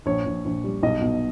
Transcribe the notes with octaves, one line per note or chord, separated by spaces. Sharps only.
A#1 C#5
A#1
A#1
G3
B1 D#5
B2